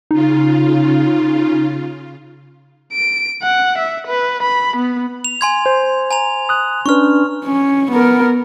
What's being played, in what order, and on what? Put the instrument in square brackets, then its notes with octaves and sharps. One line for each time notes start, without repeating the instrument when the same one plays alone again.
[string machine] C#3 F4 [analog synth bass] D#4
[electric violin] D7
F#5
E5
B4
B5
B3
[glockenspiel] F7
G#5 C6 G#6
[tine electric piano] C5
[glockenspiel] G#5 A#5 F7
[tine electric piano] D#6 F#6
[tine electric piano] C#4 D4 B4 [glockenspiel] C#6 F6
[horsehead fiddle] C#4
B3 A#4